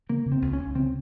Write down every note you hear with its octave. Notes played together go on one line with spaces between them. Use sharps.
C#3 A#3
C#3
C4
C#2
C#4
C#2
C#3 C4